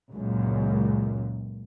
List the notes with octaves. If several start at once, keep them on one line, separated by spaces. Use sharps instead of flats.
C#2 F#2 A#2